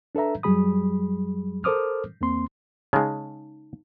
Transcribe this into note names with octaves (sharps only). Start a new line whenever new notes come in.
D4 A4 B4 E5 A#5
F#2 F#3 G3 G#4 B5 D#6
A4 A#4 C5 D6 D#6 F6
E2 A#3 C4 C6
C#3 G#3 D#4